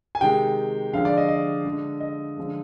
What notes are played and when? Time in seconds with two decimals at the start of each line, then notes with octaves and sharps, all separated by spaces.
0.15 G#5
0.20 C3 D#3 G#3 G5
0.93 D3 F3 G#3 F5
1.05 D5
1.17 D#5
1.29 D#5
1.65 D3 G#3
2.00 D#5
2.37 D3 F3 G#3